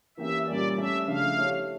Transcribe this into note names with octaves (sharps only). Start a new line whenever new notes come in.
E3 A#3 C#4 G4 E5
A#2 G3 C#4 G4 A#4 D5
A3 C#4 G4 E5
C#3 F3 A3 D4 F5
A3 E4 G4 C#5